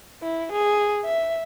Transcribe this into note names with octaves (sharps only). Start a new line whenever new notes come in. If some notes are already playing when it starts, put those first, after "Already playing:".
E4
G#4
E5